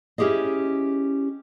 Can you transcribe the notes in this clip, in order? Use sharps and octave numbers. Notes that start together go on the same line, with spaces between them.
C#4 E4 G4 G#4 D#5